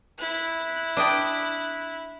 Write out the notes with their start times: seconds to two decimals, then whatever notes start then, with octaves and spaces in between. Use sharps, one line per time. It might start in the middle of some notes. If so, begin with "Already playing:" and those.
0.19 E4 F#6
0.97 D4 D#5 G5